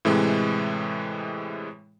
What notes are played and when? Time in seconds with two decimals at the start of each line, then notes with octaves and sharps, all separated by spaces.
0.05 A2 C3 E3 G#3